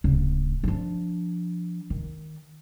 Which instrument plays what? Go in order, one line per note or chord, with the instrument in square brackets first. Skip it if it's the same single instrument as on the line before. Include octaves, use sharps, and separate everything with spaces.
[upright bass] D1 C#3
F3 D4
D#3